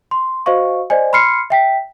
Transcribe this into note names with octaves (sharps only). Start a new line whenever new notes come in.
C6
F#4 C5 D#5 F5 C#6
C5 D5 D#5 G#5
B5 C6 F6 C7 C#7
E5 G5 B6